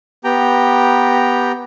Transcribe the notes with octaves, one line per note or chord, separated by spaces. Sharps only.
B3 G4 G5 A#5